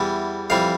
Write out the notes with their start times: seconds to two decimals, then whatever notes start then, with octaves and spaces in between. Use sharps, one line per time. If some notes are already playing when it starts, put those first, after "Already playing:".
Already playing: E2 E3 G3
0.50 F2 E3 G3 F5